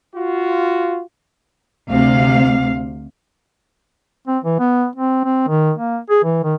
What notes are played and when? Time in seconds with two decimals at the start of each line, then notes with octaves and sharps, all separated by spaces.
0.15 F4 F#4
1.88 D2 C3 F5
4.28 C4
4.44 E3
4.59 B3
4.96 C4
5.24 C4
5.48 D#3
5.78 A#3
6.10 G#4
6.24 E3
6.44 D#3